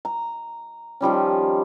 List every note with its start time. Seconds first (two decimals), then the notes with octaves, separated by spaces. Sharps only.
0.05 A#5
1.01 D#3 F3 G3 C#4